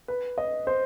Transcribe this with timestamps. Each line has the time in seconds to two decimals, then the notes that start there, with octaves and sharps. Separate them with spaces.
0.08 B4
0.38 D#5
0.67 C5